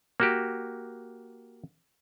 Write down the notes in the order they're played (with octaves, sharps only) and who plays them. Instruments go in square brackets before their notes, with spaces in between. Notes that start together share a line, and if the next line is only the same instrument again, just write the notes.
[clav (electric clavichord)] A#3 F#4 G4